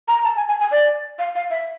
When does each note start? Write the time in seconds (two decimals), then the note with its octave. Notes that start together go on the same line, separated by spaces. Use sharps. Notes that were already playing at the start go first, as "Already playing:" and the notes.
0.08 A#5
0.24 A5
0.37 G#5
0.48 G#5
0.60 G#5
0.72 D5
1.19 F5
1.36 F5
1.51 E5